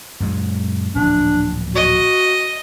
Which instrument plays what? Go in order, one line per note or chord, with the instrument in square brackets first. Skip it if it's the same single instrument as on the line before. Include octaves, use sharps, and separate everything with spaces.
[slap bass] F#2 A#2 G#3
[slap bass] D1 A#1 [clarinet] D4
[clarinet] F#4 [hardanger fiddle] D#5